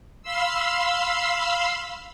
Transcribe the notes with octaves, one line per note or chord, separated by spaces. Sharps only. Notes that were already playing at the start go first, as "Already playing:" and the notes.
F5 B5 C6 E6